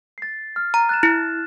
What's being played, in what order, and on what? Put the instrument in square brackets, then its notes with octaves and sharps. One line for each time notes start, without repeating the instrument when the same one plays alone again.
[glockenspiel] A6 C7
F6
[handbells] A#5
[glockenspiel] F#6 A6 E7
[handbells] E4